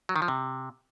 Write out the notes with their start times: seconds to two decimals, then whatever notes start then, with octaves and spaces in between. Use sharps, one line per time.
0.09 F#3
0.16 D#3
0.22 F3
0.28 C3